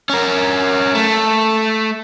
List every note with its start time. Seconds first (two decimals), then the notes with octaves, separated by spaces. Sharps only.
0.09 C#4 A#4
0.95 A3